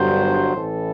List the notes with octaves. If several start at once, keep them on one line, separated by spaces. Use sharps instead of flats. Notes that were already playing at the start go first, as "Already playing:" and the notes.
Already playing: G1 G2 F#3 C5
A1 A2 E3 A4